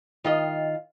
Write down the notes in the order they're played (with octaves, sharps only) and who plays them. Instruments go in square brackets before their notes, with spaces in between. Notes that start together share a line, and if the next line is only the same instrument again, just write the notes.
[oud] D#3 F4 D#5